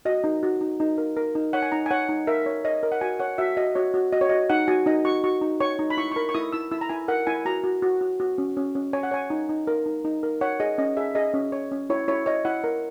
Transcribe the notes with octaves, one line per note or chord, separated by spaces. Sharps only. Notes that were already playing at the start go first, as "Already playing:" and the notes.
F#4 D#5
D#4
F#4
D#4
D#4
A#4
A#4
D#4
C#5 F#5
G#5
D#4 A#5
G#5
C#5 F#5
D#4
A#4 E5
C#5
C#5 D#5
A#4
F#5
F#4 G#5
C#5 F#5
F#4 E5
F#4 D#5
F#4 C#5
F#4
F#4 D#5
C#5
F#4 D#5
D#4 F#5
F#4 G#5
D#4 D#5
F#4 C#6
F#4 C#6
D#4
C#5 C#6
D#4
B5
E4 C#6
C#6
A#4 B5
C#6
E4 D#6
E4 E6
E4 E6
A#5
E4 G#5
A#4 F#5
E4 G#5
F#4 A#5
F#4
F#4
F#4
F#4
C#4
C#4
C#4
C#5 G#5
F#5
C#5 G#5
D#4
D#4
A#4
D#4
D#4
A#4
C#5 F#5
G#4 D#5
C#4 D#5
G#4 E5
G#4 D#5
C#4
C#5
C#4
E4 C#5
E4 C#5
C#5 D#5
E4 F#5
A#4